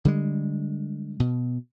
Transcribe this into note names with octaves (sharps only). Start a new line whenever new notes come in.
D3 G3 G#3
B2